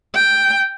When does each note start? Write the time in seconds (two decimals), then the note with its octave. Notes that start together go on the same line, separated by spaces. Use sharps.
0.15 G5